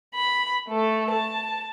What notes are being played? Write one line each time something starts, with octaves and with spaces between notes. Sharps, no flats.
B5
A3 A4
A5